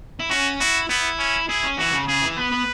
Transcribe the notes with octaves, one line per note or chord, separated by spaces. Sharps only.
E4
C#4 F#4
E4 F#4
B3 E4
C#4
E4 G#4
C#4
E3 F#4
C#3
C#3 G#4
E3
B3 B4
B3